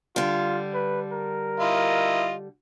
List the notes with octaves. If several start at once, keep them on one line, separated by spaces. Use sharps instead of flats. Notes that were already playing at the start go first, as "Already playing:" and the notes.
D3 G3 F4
B4
A#4
E4 F4 D#5